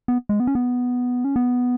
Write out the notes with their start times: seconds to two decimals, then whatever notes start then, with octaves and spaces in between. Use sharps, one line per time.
0.08 B3
0.29 G#3
0.40 B3
0.47 C#4
0.55 B3
1.24 C#4
1.36 B3